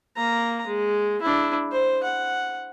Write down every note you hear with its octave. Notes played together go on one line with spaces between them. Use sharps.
A#3 A#5
G#3
D4 E4
C5
F#5